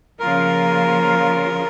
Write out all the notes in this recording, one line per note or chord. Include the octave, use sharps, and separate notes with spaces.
C#3 F3 A#3 F4 A#4